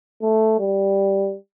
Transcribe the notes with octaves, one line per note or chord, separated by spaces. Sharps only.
A3
G3